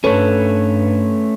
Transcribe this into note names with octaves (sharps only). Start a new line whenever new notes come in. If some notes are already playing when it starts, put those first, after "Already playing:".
G2 A3 C#4 A4 B4 C#5